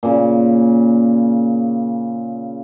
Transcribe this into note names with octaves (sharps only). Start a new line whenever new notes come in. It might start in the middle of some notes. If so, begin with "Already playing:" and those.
A#2 C#3